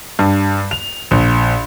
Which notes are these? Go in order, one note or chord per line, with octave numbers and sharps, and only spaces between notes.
G2
F7
A#1